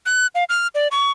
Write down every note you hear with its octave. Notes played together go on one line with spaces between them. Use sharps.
F#6
F5
F6
D5
C#6